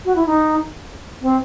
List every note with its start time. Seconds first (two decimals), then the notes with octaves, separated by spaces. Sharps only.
0.05 F#4
0.16 E4
0.26 D#4
1.22 C4